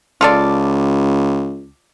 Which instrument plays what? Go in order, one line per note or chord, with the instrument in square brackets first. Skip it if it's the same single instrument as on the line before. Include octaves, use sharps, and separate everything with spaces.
[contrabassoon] C#2 [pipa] F4 A4 D5